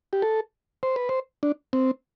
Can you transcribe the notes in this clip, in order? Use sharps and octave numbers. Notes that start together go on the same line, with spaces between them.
G4
A4
C5
B4
C5
D4
C4